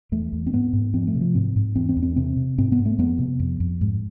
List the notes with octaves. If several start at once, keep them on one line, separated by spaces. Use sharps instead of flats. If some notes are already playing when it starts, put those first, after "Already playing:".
E2 A3
E2
C4
G#2 B3
G#2
F2 C4
A3
C3
F3
G#2 C4
G#2
E2 C4
C4
E2
C4
C3 C4
C3
G#2 C4
B3
G#2
A3
F2 B3
C3
F2
F2
G#2